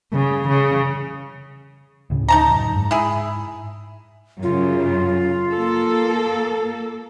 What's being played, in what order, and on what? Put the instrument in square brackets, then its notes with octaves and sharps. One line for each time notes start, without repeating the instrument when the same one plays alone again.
[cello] C#3
C#3
[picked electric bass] D2 A2 C#3
[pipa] D#4 A5 A#5
[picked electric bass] F#2
G#2
[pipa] E4 G#4
[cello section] F#2 C#3 F#3 [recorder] F4
[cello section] A#3 A4